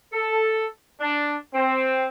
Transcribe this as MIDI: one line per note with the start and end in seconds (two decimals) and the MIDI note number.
0.13 0.66 69
1.00 1.35 62
1.54 2.05 60